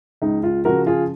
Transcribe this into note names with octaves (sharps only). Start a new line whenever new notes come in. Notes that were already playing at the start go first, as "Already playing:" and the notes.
C#2 D#4
F4
C#3 F3 F#4 A#4
F4 G#4